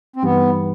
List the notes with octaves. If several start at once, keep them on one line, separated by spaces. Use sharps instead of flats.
C4
G2 E3 G3 B3 D#4 G4